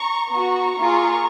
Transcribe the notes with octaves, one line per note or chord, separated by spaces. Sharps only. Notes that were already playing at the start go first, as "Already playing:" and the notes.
Already playing: A#5 C#6
B3 F#4 A#5 C#6
A#3 F4 G#4